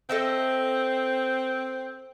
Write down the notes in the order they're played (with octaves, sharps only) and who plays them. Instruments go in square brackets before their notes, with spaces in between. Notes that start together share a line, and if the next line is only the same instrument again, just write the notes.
[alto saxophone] C4 [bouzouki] A4 D#5 E5